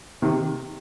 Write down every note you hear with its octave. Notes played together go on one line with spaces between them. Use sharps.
C3 D#3